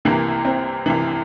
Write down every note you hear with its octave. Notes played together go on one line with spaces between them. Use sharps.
C2 C3 E3 A#3
C4
C2 C3 E3